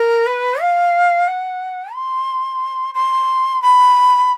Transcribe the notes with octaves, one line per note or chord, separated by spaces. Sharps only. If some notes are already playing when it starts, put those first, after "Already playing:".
Already playing: A#4
B4
F5
F#5
C6
C6
B5